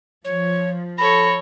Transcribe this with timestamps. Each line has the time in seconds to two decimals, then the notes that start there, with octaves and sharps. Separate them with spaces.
0.25 F3 C#5
0.98 A4 C#5 B5 A#6